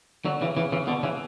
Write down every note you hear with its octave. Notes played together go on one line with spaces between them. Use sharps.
D3 F#3
C#3 E3
C#3 E3
C#3 E3
B2 D3
C#3 E3